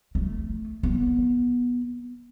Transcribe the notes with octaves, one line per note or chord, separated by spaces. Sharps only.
A3
B3